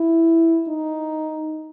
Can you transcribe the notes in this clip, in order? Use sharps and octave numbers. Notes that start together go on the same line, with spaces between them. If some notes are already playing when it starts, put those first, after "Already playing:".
Already playing: E4
D#4